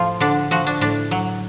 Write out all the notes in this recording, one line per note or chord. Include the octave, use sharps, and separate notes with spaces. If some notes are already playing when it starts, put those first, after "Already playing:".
Already playing: A2 F3 F4
D3 D4
F3 F#4
D4
A2 D4
F#3